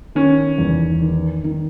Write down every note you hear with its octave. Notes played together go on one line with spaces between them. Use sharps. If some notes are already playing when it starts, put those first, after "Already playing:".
D#3 C#4
E2
D#3
D#3